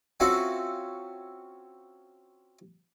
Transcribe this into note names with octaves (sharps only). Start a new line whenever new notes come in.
C4 C#4 F4 F#4 A4 E5